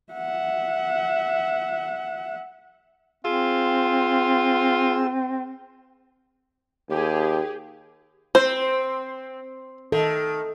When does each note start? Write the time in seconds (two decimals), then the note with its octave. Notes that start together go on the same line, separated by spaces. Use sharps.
0.13 E5 F#5
3.25 C4 F4 G#4 E6
6.90 D#2 G4 G#4
8.35 C4 C5
9.92 D#3 A4